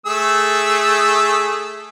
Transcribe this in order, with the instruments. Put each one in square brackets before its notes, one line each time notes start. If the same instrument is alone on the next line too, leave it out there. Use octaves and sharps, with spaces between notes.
[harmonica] A3 G#4 E6